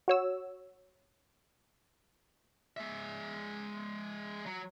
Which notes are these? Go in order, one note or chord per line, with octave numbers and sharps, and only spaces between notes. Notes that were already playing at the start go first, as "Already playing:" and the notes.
F#4 C#5 E6
G#3 E5
F#3